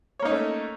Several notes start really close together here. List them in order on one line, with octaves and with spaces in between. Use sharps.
C#5 A#3 D#4 C#4 A3